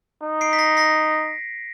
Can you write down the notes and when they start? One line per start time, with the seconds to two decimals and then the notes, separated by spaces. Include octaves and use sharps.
0.23 D#4
0.41 C7 D7
0.53 B6
0.59 A#6 C7
0.77 A#6 C7